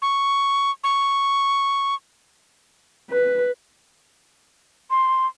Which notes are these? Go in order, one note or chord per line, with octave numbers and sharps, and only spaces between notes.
C#6
C#6
B4
C6